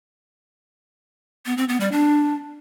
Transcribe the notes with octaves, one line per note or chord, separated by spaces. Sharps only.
B3
C4
B3
G3
D4